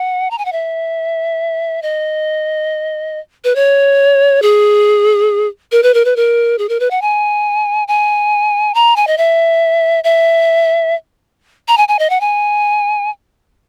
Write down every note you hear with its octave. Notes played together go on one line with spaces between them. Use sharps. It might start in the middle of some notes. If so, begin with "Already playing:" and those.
Already playing: F#5
A#5
G#5
F#5
E5
D#5
B4
C#5
G#4
A#4
B4
A#4
B4
A#4
G#4
A#4
B4
F#5
G#5
G#5
A#5
G#5
D#5
E5
E5
A#5
G#5
G#5
D#5
F#5
G#5